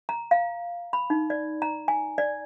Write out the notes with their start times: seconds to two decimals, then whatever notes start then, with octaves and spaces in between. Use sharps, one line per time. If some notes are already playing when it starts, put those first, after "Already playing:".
0.09 A#5
0.31 F5
0.93 B5
1.10 D#4
1.30 D5
1.62 A#5
1.88 G#5
2.18 D5